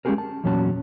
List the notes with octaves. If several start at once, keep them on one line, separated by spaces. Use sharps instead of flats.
G#3 C#4 D4 G4 G#4 A#4
A5
E2 A#2 F#3 C#4 F#4 A5